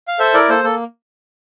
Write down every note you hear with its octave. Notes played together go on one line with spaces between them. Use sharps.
F5
A4 C5 E5
E4 A#4 D5
A#3 A4 C5
A#3 A4